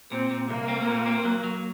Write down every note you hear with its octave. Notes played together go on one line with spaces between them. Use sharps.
A#2 C4
A#2
C2 A#3
C4
A#2
C4
F#3
F#3